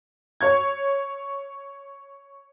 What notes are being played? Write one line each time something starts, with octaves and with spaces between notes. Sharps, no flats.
C#5 C#6 G#6